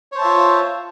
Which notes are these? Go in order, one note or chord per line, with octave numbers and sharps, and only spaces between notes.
F4 C5 C#5 E5 A5